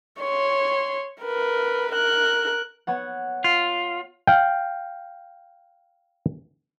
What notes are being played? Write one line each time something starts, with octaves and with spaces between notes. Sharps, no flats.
C#5 C6
A#4 B4
A#4 F#6
B3 C#5 F#5
F4
F5 G5